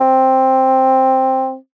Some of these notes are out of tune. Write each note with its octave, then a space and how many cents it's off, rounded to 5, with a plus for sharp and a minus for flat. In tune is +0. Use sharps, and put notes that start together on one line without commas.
C4 +5